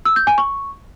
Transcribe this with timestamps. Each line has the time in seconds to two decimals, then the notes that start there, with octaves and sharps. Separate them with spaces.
0.05 E6
0.16 G6
0.27 G#5
0.38 C#6